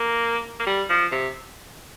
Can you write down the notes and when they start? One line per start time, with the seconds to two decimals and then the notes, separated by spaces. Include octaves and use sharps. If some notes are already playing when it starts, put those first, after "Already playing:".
Already playing: A#3
0.59 A#3
0.66 G3
0.89 F3
1.12 C3